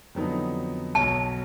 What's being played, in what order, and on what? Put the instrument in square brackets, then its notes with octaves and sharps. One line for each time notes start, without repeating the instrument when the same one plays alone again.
[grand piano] F2 D3 F#3 B3 D#4
[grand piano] B1 B2 F#3 [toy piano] A5